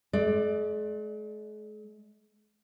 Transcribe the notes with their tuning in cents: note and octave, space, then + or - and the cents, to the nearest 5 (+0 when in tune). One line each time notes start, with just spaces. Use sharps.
G#3 +45 D5 +15